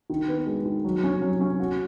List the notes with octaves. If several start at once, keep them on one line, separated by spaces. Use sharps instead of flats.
D#3
B3
G#3
D#3
F#3
C#4
F#3
C#4
F#4